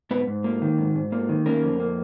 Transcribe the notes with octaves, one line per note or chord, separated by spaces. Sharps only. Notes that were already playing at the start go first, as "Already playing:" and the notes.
G#2 B3 B4
G#2
A#3
D#3
G#2
G#2
A#3
D#3
A#3 C#4 A#4
F2
A#3